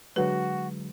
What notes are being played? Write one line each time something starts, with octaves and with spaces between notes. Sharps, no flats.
D3 F#3 G#3 F#4 B4